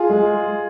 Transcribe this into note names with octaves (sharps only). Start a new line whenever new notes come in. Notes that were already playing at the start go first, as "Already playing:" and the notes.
Already playing: F4 G#4
G#3